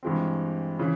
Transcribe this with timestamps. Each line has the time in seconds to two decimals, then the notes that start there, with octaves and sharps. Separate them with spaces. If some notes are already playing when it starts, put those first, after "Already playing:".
0.03 G2 E3 G#3 C4
0.79 C#3 E3